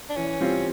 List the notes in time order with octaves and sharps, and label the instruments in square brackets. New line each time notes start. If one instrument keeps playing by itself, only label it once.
[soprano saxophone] D4
[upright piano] E3 [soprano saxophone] C#4
[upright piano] G3 C4 F4